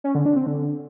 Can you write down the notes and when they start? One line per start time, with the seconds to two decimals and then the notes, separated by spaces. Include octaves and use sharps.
0.04 C#4
0.15 D3
0.25 D4
0.36 C4
0.47 D3